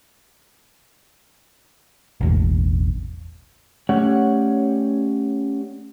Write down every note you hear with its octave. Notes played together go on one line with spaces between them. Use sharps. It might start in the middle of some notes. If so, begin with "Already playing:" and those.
E1 A1
A3 C#4 G4 C#5 D5 F#5